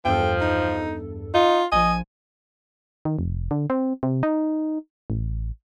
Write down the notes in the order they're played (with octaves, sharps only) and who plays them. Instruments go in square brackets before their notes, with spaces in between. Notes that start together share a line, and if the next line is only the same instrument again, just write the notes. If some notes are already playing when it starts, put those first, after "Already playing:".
[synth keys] E2 G2 A4 [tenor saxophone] F3 [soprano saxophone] G5
[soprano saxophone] D#4
[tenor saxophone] D#4 [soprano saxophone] F4
[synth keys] A#1 F3 [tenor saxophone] D#5 [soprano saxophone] G#5
[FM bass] D#3
F1
D3
C4
C3
D#4
A1